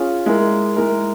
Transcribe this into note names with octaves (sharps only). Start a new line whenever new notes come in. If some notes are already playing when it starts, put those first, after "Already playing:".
Already playing: C#4 F4 G#4
G#3 E4 A#4
G#3 E4 A#4